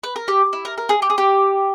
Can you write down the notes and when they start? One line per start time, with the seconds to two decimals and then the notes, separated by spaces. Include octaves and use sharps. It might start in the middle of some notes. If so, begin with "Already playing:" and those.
0.04 B4
0.16 A#4
0.28 G4
0.53 E4
0.65 A#4
0.78 A#4
0.89 G#4
1.02 G4
1.10 G#4
1.18 G4